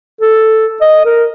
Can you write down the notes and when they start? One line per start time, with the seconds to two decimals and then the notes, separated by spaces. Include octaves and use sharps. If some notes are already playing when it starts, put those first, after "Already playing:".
0.21 A4
0.81 D#5
1.05 A#4